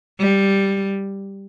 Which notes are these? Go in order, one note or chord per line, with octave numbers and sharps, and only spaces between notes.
G3